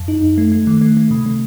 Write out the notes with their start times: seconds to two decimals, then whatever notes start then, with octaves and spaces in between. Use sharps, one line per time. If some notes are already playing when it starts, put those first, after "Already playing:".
Already playing: F#2
0.08 D#4
0.22 F#2
0.38 A3
0.52 A3
0.67 D#3
0.81 A3
0.97 A3
1.11 C3
1.26 A3